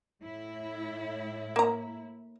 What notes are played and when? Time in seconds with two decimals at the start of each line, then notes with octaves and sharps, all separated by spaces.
0.22 A2 E4
1.56 A#3 A#5